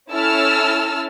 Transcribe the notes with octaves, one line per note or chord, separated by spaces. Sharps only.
C#4 E4 A4 A5 E6 F6